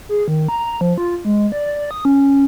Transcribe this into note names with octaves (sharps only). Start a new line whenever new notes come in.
G#4
D#3
A#5
F3
F4
G#3
D5
D5
D#6
C#4